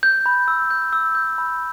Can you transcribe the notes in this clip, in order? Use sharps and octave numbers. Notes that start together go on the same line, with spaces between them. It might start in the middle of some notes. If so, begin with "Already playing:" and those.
G6
B5
E6
G6
E6
G6
B5